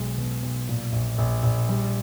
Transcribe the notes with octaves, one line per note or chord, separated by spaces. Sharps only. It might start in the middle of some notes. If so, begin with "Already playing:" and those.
Already playing: B1 G#3
B2
B1
A#2
A#1
A#1
A#1
G3